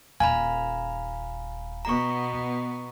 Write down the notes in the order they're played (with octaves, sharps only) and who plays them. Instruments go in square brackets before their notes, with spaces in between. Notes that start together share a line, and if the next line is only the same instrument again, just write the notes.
[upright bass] D#1 [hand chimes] F5 A#5 B5 [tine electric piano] G#5
[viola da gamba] B2 B3 [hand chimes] A#5 C#6